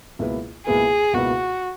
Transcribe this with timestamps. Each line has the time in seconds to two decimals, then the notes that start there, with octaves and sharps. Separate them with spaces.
0.19 C#2 B2 A#3 E4 B4
0.66 C#2 B2 A#3 E4 G#4 B4
1.13 C#2 B2 A#3 E4 F#4 B4